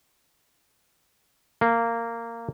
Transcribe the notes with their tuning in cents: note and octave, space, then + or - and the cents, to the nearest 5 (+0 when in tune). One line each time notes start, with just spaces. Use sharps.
A#3 -15